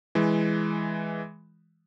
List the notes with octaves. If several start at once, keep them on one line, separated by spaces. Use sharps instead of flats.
E3 G#3